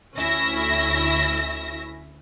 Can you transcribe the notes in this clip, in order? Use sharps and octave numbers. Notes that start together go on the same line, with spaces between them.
D2 C#4 E4 E5 A#6